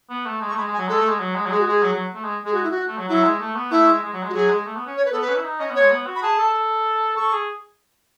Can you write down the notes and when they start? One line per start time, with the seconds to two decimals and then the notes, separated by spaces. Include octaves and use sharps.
0.10 B3
0.26 A3
0.41 G#3
0.49 C#6
0.53 A3
0.57 G#3 B5
0.68 G#3
0.74 G#5
0.78 F#3
0.89 G#3 A4
0.99 A3
1.09 G#3
1.20 F#3
1.36 G#3
1.46 F#3
1.51 G#3 G#4
1.60 F#4
1.67 G#3 G#4
1.83 F#3
1.93 F#3
2.15 A3
2.24 G#3
2.45 G#3 G#4
2.54 F#4
2.63 E4
2.71 F#4
2.88 A3
2.98 F#3
3.08 F#3 E4
3.24 G#3
3.40 A3
3.56 B3
3.71 A3 E4
3.87 G#3
4.03 G#3
4.13 F#3
4.23 G#3
4.29 F#4
4.34 F#3 G#4
4.50 G#3
4.65 A3
4.76 B3
4.87 C#4
4.97 C#5
5.05 B4
5.12 B3 A4
5.21 B4
5.28 C#4
5.36 E4
5.44 D#4
5.59 C#4 D#5
5.70 B3
5.75 C#5
5.81 G#3
5.91 B3
6.07 F#4
6.16 B5
6.23 G#4 A5
6.38 A4
7.16 A4 C#6
7.32 G#4